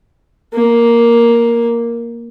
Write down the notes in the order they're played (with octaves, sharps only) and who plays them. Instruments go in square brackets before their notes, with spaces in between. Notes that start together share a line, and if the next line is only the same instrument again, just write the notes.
[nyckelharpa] A#3